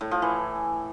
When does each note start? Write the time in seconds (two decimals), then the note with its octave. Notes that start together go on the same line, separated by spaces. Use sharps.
0.01 A2
0.11 F3
0.22 E3